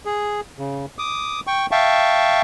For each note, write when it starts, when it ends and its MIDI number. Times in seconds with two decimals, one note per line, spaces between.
0.05 0.41 68
0.59 0.86 49
0.98 1.40 86
0.98 1.40 87
1.47 1.66 79
1.47 1.66 85
1.71 2.42 76
1.71 2.42 77
1.71 2.42 79
1.71 2.42 81
1.71 2.42 85